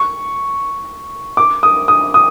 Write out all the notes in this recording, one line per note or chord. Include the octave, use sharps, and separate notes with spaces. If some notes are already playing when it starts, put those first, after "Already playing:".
Already playing: C#6
D6
D#6
D#6
D#6